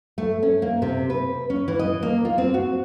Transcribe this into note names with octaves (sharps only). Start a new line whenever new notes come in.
A3
C#4
A#3
C3
B4
C#4
E3
D#5
A#3
F4
C4
F#4